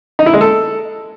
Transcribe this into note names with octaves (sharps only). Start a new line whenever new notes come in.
D#4
E4
G#3
A4